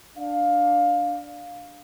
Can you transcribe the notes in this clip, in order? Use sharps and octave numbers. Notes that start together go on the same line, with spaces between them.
D4 F5